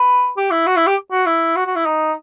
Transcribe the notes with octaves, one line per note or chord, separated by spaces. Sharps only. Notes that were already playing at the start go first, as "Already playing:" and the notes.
Already playing: B4
G4
E4
F#4
E4
G4
F#4
E4
F#4
F#4
E4
D#4